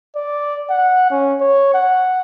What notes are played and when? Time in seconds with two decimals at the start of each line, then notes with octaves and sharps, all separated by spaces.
0.16 D5
0.70 F#5
1.11 C#4
1.40 C#5
1.74 F#5